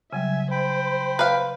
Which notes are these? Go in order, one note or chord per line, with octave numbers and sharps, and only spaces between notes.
C#3 F#3 G3 E5 G#5
C5 G5 B5
B4 F5